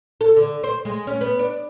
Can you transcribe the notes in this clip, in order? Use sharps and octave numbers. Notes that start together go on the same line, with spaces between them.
A4
D3
C5
G#3
C#4
B3
D4